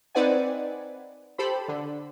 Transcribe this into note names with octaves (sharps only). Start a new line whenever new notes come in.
C4 D#4 B4 D5 F#5 G#5
G4 A4 C5 B5
D3